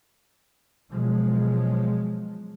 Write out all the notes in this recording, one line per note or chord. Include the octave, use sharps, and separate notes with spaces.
B2 F3 F#3 G#3